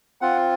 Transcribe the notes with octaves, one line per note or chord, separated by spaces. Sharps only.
C4 F4 F#5